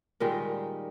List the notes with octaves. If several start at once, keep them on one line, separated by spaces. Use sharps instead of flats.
A#2 D#3 G3 G#3